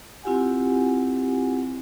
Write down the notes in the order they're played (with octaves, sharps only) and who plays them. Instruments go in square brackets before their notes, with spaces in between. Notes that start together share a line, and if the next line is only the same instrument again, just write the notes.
[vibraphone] C4 E4 F4 G4 F#5 G#5